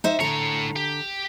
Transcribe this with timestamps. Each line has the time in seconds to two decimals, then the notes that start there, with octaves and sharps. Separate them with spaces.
0.04 D#4 C5 E5
0.20 A2 D3 C#5 A#5
0.76 G4